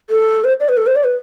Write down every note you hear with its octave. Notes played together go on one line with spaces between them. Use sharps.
A4
C5
D5
B4
A4
C5
D5
B4